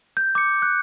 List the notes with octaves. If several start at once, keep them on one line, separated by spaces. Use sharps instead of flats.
G6
D6 C#7
F#6